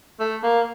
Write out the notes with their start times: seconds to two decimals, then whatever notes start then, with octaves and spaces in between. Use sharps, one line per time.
0.19 A3
0.43 A#3